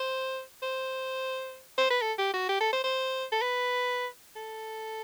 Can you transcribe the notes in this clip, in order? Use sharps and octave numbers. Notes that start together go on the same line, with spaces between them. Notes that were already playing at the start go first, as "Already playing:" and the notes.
Already playing: C5
C5
C5
B4
A4
G4
F#4
G4
A4
C5
C5
A4
B4
A4